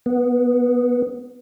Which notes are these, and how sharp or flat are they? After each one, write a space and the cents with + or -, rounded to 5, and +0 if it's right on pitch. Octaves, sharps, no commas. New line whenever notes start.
B3 -10